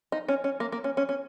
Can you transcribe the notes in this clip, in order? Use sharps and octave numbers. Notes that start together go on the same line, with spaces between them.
D#4
C#4
C#4
A#3
A#3
C#4
C#4
C#4